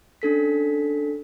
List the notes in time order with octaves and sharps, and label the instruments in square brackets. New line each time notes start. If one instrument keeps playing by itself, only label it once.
[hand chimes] C#4 D4 A4 B6